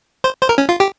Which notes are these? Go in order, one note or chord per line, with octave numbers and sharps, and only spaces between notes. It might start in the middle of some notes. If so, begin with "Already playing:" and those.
C5
C5
A#4
C#4
F4
G4